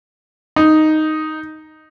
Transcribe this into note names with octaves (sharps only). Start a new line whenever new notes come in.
D#4